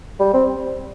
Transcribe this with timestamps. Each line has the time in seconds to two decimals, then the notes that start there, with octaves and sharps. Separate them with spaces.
0.19 G3
0.33 C4